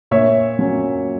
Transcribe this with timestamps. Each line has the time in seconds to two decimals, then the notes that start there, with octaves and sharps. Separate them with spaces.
0.11 A#2 C#5 E5
0.59 F#3 C#4